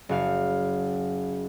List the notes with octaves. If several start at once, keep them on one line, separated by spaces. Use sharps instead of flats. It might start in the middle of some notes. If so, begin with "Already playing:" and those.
F#1 F#4 F5